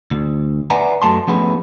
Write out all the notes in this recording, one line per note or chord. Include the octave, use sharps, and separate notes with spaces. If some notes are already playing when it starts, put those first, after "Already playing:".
D2
B4 D5 E5 F#5 G#5 A#5
F#2 F#3 A3 A5 C6
F3 A3 B3 C#4 E4 G#4